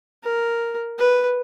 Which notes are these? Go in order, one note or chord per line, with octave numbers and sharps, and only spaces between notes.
A#4
B4